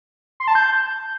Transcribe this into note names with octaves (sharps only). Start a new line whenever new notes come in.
C6
A5
G6